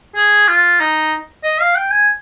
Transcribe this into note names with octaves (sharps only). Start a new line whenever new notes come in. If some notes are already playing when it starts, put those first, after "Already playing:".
G#4
F4
D#4
D#5
F5
G5
G#5